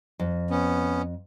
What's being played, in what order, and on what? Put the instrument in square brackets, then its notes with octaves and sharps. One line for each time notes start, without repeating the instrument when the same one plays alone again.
[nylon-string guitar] F2
[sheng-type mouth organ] B3 C#4